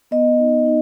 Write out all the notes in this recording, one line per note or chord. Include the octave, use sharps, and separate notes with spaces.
B3 D#5
D#4
D#4